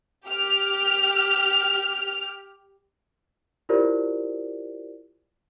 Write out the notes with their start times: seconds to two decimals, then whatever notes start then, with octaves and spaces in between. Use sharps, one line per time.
0.26 G4 F6
3.69 E4 F4 G4 A#4 C5 D5